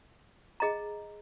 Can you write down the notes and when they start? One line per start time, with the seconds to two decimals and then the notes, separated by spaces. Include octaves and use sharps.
0.60 G#4 D#5 A#5